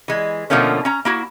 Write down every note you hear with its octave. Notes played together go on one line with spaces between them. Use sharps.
E3 G#3
B2 D3 F3 A3 A#3 C#4
C#4 A#5
A#3 E4 F#4